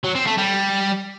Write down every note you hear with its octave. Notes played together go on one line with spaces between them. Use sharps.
F#3
C4
A3
G3